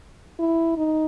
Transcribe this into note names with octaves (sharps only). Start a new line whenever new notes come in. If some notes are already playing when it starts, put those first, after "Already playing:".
E4
D#4